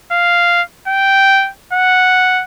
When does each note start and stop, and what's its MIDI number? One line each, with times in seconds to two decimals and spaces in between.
0.12 0.62 77
0.88 1.50 79
1.73 2.44 78